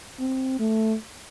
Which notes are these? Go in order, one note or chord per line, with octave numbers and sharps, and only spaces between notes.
C4
A3